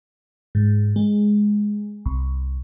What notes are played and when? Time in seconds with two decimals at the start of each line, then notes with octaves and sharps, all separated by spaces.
0.55 G#2
0.96 G#3
2.06 C2